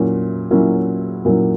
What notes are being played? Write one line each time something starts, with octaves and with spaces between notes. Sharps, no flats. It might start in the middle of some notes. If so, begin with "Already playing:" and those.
Already playing: A#2 F#3 A#3 C#4 E4
A#2 F#3 A#3 C#4 E4
A#2 F#3 A#3 C#4 E4